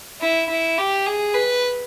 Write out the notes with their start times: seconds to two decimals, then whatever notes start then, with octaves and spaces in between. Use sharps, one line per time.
0.21 E4
0.49 E4
0.78 G4
1.06 G#4
1.34 B4